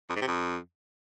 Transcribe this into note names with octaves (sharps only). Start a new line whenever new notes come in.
F2
G#2
C3
F2